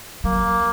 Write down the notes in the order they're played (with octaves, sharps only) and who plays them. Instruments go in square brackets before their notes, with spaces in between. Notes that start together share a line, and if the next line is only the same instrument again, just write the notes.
[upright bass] F#3 [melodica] A#3